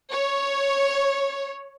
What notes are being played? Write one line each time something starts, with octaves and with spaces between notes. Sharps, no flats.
C#5